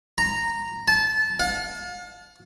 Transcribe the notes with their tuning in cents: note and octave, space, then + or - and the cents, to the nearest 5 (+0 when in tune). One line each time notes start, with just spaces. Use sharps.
A#5 -10
A5 -20
F5 +40